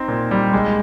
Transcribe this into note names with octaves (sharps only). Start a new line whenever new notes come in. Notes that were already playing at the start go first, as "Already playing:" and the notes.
Already playing: C4 D#4
A#2
G3
G#3